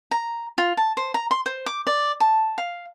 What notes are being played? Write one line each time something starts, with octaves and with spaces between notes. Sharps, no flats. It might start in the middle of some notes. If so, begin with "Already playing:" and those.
A#5
F4
A5
C5
A#5
C6
C5
D6
D5
A5
F5